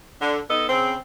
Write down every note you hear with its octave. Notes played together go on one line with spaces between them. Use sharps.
D3
B3 D#4 A4 D#5
C#3 C4